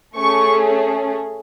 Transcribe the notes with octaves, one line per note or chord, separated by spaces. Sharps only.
A3 C#4 G#4 C#6